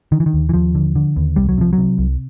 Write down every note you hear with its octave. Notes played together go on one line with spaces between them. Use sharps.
D3 D#3
E3
D#3
D#2
E3
D#2 F3
D3
D3
D#2
C2 G3
F#3
C3 F3
F#3
C3
C2